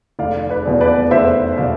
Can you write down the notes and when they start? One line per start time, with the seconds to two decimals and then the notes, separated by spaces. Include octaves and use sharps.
0.19 F1 D5 F5
0.50 B4 D5
0.65 E2 B2
0.81 B4 D5
1.11 F1 C5 E5
1.57 B2 D5 F5